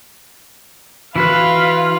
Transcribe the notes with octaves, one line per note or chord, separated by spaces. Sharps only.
E3 F4 F#4 B4 F5 B5 F#6